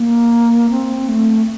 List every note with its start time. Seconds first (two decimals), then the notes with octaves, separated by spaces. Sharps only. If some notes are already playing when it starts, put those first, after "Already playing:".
Already playing: A#3
0.70 C4
1.09 A3